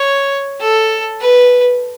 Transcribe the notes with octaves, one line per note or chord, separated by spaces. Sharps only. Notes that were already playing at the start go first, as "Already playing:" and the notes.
Already playing: C#5
A4
B4